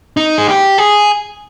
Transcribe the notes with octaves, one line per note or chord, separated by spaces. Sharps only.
D#4
G#4
G4
G#4